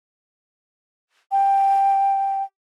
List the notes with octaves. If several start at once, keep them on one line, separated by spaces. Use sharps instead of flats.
G5